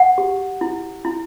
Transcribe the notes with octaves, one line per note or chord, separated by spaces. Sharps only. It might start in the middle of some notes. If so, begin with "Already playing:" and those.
Already playing: F#5
G4
E4
E4